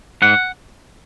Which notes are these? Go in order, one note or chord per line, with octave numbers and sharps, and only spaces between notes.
G#2 F#5